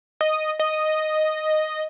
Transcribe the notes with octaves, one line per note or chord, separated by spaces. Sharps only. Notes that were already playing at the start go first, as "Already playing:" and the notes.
D#5
D#5